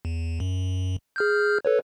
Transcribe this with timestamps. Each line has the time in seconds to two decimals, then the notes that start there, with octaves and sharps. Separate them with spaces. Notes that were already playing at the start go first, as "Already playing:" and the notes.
0.05 E2
0.40 F#2
1.16 G#4 F6 G6
1.65 A4 B4 C#5